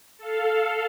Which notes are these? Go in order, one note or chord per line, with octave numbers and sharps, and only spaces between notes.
A4 F5